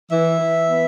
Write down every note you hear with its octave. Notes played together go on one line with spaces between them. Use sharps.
E3 E5
E3
B3